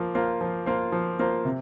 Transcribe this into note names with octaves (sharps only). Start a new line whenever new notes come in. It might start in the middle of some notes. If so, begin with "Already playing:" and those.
Already playing: F3 A#3 F4
A#3 F4 C5
F3
A#3 F4 C5
F3
A#3 F4 C5
C3